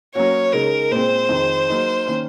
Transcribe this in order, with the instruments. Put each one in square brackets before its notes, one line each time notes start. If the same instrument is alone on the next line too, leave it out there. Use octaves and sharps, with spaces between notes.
[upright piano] F#3 A#3 C#4 F#4 [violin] C#5
[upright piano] C#3 G#3 D#4 [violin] A#4
[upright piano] A#2 G#3 C4 [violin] C5
[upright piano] F2 D#3 G#3
F#3 A#3 D#4 G#4
D#3 A#3 C#4